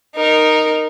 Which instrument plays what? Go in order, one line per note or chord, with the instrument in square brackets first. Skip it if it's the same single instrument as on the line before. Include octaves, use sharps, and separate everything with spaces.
[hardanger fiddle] D#4 A#4